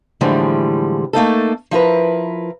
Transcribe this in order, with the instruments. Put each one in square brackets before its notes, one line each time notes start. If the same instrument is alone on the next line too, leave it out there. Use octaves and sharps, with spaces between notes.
[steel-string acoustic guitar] A2 D3 E3 F3 G3 G#3
A3 A#3 D#4 A4
F3 E4 A#4 B4